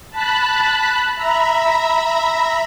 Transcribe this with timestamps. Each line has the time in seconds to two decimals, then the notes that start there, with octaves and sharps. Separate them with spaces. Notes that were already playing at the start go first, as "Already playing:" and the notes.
0.10 A5 B5 F#6
1.15 E5 A#5 B5